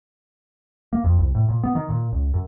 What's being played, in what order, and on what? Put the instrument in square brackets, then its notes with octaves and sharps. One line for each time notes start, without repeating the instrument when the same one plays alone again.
[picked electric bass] A#3
F2
C2
A2
A#2
B3
D#3
A#2
C#2
F#2